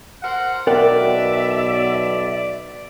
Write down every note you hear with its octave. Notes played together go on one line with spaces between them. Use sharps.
A#4 C5 F#5
B1 B2 A#4 D5 E5 F#5 G5